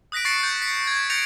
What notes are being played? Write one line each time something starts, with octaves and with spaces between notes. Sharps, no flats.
D#6 F#6 A#6 B6 D7
C#6 A6 C7 C#7
G6 A6
B6 C#7
G#6 A6
G6 A6 A#6 C#7 D7 F7